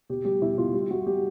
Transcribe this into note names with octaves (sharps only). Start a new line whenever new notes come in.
B2 G4
G3 G4
B2 E4
B2 F4
G3 G4
G3 F#4
G3 G4